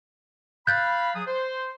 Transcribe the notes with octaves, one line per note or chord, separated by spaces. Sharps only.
F5 B5 F#6 G6 A6
F#3 G#4 D#6
C5